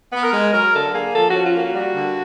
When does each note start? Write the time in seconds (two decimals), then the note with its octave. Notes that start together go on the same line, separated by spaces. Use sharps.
0.12 B3
0.23 A#4
0.33 G#3
0.53 F#3 A#4
0.73 D3 A4
0.93 A#3 G#4
1.14 F3 A4
1.29 C#4 F#4
1.44 F4
1.54 A#3 F#4
1.74 G3 F#4
1.94 D3